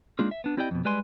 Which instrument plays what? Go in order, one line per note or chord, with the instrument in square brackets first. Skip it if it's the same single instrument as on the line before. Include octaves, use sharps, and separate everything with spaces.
[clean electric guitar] G#3 A#3 D4 D#4 F4 G#4
E5
B3 D4
C4 E4 G4 D5 D#5 G5
F2 B2
G3 G#3 B4 D5 G#5 C6